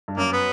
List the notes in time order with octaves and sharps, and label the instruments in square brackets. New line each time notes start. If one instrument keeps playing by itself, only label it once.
[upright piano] G2
[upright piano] F#2 [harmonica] A#3
[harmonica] B3